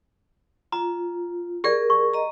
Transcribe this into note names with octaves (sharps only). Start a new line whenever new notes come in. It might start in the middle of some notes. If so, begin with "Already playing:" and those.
F4 A#5
G4 G#4 A#4 D5
C#6
D#5 A#5